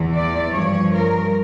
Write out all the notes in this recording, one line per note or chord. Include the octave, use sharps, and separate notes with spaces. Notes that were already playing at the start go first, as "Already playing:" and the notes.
Already playing: E2 E3
D5
G2 F3 C#5
A#4